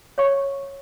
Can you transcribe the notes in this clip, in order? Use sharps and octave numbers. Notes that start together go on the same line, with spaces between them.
C#5 F5 C#6